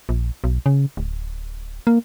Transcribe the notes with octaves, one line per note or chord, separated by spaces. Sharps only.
A#1
B1
C#3
D1
A#3